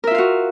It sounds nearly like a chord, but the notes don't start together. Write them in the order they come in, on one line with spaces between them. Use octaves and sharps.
A#4 E5 F4 F5 F#4